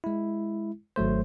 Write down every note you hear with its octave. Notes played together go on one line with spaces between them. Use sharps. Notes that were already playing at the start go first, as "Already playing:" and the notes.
G#3 E4
G#1 F#3 A3 C5